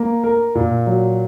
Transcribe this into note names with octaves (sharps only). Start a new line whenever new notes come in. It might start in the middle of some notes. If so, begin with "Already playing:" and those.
Already playing: A#3
A#4
A#2
F#3